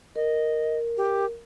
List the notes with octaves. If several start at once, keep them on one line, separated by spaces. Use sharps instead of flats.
A#4 D#5
G4